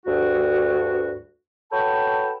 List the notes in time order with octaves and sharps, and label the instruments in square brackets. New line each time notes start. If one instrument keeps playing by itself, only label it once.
[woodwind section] D2 G2 F#4
F#4 A4 B4 C#5 G5 A5